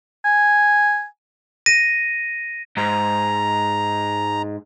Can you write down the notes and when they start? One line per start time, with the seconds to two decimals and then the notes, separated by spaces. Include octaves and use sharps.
0.25 G#5
1.66 A#6 D#7
2.77 G#2 A#5